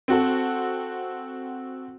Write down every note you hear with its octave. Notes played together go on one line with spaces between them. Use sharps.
C4 F#4 A4